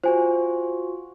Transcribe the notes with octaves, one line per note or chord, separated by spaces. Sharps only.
F4 F#4 C5 G#5